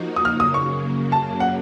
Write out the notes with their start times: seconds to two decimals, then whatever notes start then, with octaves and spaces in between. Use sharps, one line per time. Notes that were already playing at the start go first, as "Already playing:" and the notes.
Already playing: F3 A#3 D#4 F#4
0.16 D#6
0.25 F#2 C#3 F#3 A#3 F6
0.40 D#6
0.54 C#6
1.12 A5
1.40 F#5